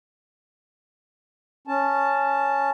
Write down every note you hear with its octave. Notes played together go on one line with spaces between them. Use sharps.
C#4 A5